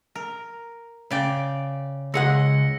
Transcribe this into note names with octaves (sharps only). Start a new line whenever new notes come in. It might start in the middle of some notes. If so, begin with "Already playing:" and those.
A#4
C#3 D5 G5
C#2 G#4 F#5 E6 A#6 C#7